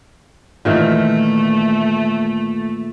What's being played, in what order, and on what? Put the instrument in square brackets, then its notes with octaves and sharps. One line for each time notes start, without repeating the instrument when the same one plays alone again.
[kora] A#2 D#3 E3 [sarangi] A3